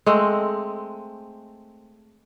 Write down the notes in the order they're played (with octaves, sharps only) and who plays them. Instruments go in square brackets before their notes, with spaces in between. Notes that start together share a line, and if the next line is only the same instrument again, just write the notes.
[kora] G#3 A3 C4